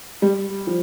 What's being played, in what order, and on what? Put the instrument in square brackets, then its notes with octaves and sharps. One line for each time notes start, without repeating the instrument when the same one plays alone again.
[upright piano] G3
F3